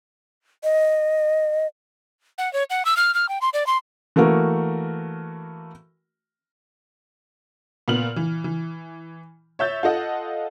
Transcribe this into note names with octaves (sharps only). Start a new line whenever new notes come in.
D#5
F#5
C#5
F#5
E6
F6
F6
G5
C6
D5
C6
E3 A3 A#3 F#4 A#4
A#2 B3 F6 F#7
E3
E3
C#5 E5 G6 A6
F4 A4 D#5 F#5